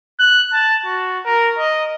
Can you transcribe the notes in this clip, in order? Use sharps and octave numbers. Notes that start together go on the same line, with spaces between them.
F#6
A5
F#4
A#4
D#5